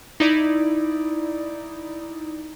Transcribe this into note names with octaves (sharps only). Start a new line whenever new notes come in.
D#4 E4 D5